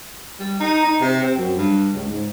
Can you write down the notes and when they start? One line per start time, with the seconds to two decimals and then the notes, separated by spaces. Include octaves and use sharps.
0.40 G3
0.60 D#4
0.84 D#4
1.01 C3
1.23 C4
1.37 F#2
1.57 G2
1.93 C#2
2.08 G#2